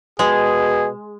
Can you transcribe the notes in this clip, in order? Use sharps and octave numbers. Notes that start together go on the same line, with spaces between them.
B2 G#3 G#4